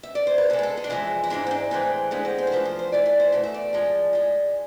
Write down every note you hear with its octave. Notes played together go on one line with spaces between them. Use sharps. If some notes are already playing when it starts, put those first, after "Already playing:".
E5
D5
C5
B4
B2 G#3 A4
B4
A4
G#4
D4
F2 E3 G#3 E4
E4
G#2 E3 G#3 D4
C4
D4
A2 E3 G#3 C4
D2 D3 G#3 B3
C4
C4
C5
E2 D3 F3 A3 B4
C5
C5
A2 E3 A3 D5
D5
C5
E2 B2 A3 D5
E5
D5
A2 F3 G#3
A2 G#3